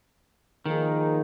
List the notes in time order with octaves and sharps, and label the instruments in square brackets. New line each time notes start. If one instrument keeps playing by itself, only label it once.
[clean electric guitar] D#3 [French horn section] F3 A#3 D#4 G#4